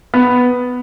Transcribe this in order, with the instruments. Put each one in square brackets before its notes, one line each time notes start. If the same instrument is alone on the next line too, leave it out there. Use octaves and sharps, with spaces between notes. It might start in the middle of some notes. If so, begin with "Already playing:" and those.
[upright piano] B3